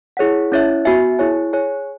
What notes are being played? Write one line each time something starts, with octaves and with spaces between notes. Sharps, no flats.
E4 G#4 C#5 F#5
C#4 E4 C#5 E5
B3 F#4 E5 G#5
E4 G#4 C#5 G#5
G#4 C#5 G#5